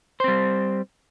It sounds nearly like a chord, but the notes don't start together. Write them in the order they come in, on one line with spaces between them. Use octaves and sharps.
C5 C4 G3